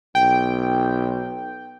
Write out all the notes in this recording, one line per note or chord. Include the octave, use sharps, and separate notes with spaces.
B1 G5